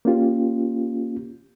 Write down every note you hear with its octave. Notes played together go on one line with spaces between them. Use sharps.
A#3 C#4 F4 G4